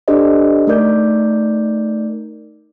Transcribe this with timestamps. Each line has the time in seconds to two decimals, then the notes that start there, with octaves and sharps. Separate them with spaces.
0.08 D4 G4 A4 C5 D5 D#5
0.67 A3 D#4 A#4 D5 G6